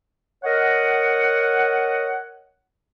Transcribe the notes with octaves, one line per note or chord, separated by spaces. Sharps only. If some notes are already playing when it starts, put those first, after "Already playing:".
A#4 C#5 D#5 F#5